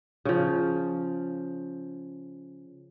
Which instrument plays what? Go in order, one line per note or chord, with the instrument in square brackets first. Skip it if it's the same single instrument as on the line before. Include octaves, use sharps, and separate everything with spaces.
[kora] C#3 F3